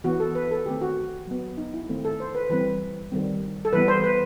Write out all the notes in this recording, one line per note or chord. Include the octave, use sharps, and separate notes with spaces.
E3 B3 F#4
A4
B4
A4
D#3 A3 C4 G4
F#4
F#3 B3
D#4
E4
D#3 A3 C4
A4
C5
B4
E3 G3 C4 B4
D#3 G3 C4
A4
E3 G3 B3 B4
C5
B4